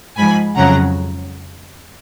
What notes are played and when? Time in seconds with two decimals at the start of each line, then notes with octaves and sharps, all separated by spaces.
0.17 G#2 F3 G#5 B5
0.56 F2 C#3 F#3 F#5 A#5